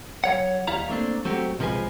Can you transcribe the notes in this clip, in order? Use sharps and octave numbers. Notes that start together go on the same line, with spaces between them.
F#3 C#5 F#5
D#2 G3 E4 F5 A#5
A3 A#3 C4 D4
F#3 A3 C4 F#4 G4
B1 C3 F3 G#3 B4 G#5